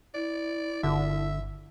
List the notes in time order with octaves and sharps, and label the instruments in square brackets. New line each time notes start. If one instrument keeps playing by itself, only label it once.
[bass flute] E4 [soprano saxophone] D5
[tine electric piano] G1 [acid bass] D3 [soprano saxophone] E5